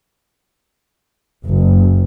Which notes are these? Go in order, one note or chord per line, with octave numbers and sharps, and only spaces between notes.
F#1